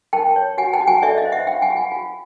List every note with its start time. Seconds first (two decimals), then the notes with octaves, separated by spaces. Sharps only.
0.13 A#4 G5 A5
0.36 C#5
0.58 F#4 F#5 G#5
0.73 G5 A5
0.81 F#4
0.87 F#5 G#5
1.02 A4 D5 E5
1.18 D#5 F5
1.25 C5
1.32 E5 F#5
1.47 F4 F5 G5
1.62 F#5 G#5
1.70 F4
1.77 F#5 G#5
1.92 F4